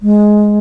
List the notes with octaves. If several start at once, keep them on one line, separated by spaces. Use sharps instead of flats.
G#3